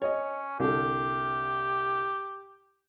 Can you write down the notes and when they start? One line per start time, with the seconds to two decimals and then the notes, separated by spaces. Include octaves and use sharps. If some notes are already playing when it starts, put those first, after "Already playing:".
0.02 C#4 C#5 D#5
0.60 C2 D3 G4 A4